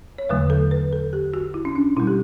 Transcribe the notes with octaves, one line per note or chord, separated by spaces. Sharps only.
C#5
E2 D3 F#3 A3 B4
A4
B4
A4
G4
F#4
E4
C#4
D4
B2 G3 E4
G4